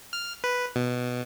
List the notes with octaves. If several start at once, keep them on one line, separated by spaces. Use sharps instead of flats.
F6
B4
B2